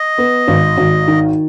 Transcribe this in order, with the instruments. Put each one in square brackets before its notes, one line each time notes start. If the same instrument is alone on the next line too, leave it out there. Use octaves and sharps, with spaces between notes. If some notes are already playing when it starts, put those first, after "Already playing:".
Already playing: [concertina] D#5
[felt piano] B3
G#1
G#1
D#3